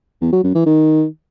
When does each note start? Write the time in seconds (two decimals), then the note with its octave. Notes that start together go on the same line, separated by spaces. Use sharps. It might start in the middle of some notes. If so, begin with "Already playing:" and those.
0.22 E2
0.33 F#3
0.44 F#2
0.55 E3
0.66 D#3